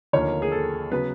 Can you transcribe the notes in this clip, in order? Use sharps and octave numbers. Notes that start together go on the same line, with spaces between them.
D#2 D3 F3 A#3 C#5
G#4
A4
C#3 F#3 B3 B4